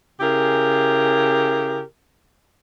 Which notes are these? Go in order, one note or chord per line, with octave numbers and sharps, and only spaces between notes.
C#3 E4 G4 G#4 A#4